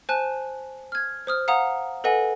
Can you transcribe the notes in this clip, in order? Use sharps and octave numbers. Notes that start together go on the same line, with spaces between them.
C5 G#5 A5 F#6
F6 G#6
C5 D#6 F6
F5 F#5 A#5 D#6
A4 B4 D#5 F#5 G#5